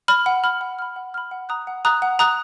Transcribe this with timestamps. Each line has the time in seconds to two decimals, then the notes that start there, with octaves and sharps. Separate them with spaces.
0.08 B5 F6
0.26 F#5
0.44 B5 F6
0.61 F#5
0.79 B5 F6
0.96 F#5
1.14 B5 F6
1.31 F#5
1.49 A#5 D#6 F#6
1.67 F#5
1.85 A#5 D#6 F#6
2.02 F#5
2.19 A#5 D#6 F#6